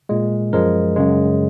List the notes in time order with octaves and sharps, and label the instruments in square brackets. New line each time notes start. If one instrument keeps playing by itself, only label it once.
[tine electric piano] A#2 G#3
F#2 F3 G#3 A#4
F#2 C#3 G#3